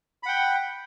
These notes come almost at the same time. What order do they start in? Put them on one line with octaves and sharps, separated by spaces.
B5 F#5 G5